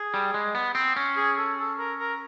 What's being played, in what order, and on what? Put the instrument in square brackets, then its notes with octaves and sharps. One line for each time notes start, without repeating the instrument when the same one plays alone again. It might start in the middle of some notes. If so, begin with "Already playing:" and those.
Already playing: [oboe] G#4
[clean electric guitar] G3
G#3
B3
C4
C#4
[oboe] G#4
A4
A4
A#4
A#4